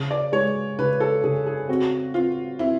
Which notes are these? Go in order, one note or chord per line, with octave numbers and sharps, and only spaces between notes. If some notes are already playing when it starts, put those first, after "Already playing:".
Already playing: C#3
D5
G#3 C#5
C#3 B4
A4
C#3 G#4
G#4
C4 F#4
C4 F4
C4 E4